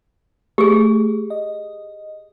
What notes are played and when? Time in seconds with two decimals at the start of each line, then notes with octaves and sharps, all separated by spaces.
0.58 A3 G4 G#4
1.30 D#5